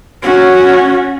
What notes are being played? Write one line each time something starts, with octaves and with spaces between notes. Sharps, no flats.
C#4 F#4